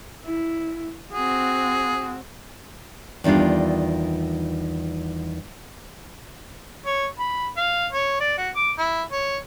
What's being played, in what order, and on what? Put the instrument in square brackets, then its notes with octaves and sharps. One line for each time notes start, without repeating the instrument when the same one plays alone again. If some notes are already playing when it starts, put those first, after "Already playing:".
[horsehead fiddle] E4
[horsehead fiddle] C4 F#4 [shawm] G#4
[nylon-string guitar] E2 D#3 G3 D4 F4
[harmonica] C#5
B5
F5
C#5
D5
F#4
D6
E4
C#5